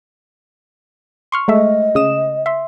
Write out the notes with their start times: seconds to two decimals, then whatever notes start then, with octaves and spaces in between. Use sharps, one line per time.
1.32 C6 C#6 F6
1.48 G#3 A3 D#5 E5
1.95 C#3 D#6 E7
2.46 E5 C6